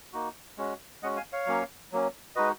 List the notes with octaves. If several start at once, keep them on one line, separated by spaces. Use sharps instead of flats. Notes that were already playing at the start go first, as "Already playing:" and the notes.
A#3 D#4 F#4
G#3 C#4 F#4
G#3 C#4 F#4 D#5 F#5
F5 G#5
C#5 F5
F#3 A#3 C#4
F#3 A#3 C#4
G#3 D#4 F#4 B4 D#5